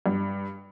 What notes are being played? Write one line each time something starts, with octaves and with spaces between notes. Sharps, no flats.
G2